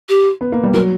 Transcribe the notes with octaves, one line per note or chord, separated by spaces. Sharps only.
G4
B3
A#3
G3
F#3 A#4